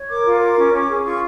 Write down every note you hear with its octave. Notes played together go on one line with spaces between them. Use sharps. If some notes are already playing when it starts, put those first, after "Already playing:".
Already playing: C#5
A#4 D6
F4
D6
A#4
C#4
C#4
G#4
F4 C#6